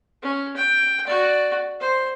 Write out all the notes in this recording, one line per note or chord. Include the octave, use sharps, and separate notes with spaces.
C#4
G5
F#4 D5
C5